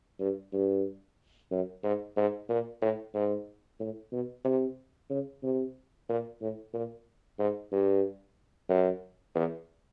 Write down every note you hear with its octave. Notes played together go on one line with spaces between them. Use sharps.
G2
G2
F#2
G#2
G#2
A#2
A2
G#2
A2
B2
C3
C#3
C3
A#2
A2
A#2
G#2
G2
F#2
E2